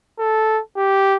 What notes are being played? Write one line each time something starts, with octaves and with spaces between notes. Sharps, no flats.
A4
G4